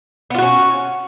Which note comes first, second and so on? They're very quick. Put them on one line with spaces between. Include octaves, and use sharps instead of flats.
B3 F4 F#4 C#4